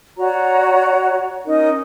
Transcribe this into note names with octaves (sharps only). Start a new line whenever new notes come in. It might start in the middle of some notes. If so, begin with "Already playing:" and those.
F#4 C#5 D5 A#5
C#4 D#4 A#4 D#5